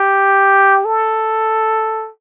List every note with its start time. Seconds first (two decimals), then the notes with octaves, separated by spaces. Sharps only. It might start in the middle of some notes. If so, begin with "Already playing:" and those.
Already playing: G4
0.85 A4